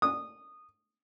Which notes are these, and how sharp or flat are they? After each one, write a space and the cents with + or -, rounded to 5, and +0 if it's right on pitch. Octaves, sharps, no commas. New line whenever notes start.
D#6 -15